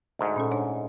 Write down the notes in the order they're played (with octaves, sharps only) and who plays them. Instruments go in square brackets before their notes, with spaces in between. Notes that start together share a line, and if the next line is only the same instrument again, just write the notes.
[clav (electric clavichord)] D2 G#2
[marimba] A#2 C#4 A4
D4 C5 C#5